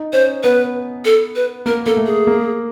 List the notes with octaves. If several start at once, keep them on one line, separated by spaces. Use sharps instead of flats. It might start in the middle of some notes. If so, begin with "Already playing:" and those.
Already playing: D#4
C#4 C5
B3 B4
A4
B4
A#3 A#4
A#3 A4
A3
G#4
A#3